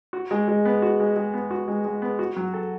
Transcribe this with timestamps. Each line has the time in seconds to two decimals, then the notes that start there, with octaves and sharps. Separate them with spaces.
0.13 F#4
0.31 G#3
0.48 G#3
0.65 B3
0.82 F#4
1.00 G#3
1.16 G#3
1.34 B3
1.51 F#4
1.68 G#3
1.85 G#3
2.02 B3
2.19 F#4
2.36 F#3
2.54 A4